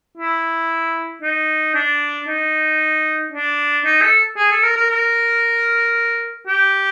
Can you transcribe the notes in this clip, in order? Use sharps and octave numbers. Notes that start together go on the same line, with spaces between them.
E4
D#4
D4
D#4
D4
D#4
A4
G#4
A4
A#4
A#4
A#4
G4